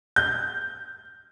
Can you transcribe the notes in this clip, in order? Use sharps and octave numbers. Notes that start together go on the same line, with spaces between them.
G6